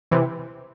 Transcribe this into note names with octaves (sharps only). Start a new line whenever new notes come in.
C3 E3